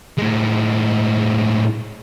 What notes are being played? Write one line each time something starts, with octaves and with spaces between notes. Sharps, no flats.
A2 G#3